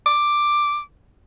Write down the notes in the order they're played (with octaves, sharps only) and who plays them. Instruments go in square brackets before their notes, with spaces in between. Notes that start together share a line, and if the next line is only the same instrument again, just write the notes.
[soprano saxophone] D6